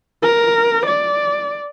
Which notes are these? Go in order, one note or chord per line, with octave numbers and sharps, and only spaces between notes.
A#4
D5